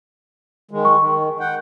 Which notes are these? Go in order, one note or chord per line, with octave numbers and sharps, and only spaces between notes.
D#3 G#3
C#6
D#3
F#5 G5